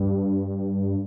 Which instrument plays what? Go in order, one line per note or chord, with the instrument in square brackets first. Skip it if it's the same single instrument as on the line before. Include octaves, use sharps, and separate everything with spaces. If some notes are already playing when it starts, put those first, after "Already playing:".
Already playing: [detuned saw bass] G2